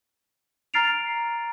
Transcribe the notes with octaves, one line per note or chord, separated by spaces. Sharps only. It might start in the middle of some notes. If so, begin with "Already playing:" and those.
A#5 F6 A6 C7 D7 F7